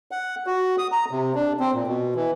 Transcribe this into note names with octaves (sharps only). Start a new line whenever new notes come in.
F#5
F#4
D#6
A#5
C3
D4
C4
A#2
B2
E3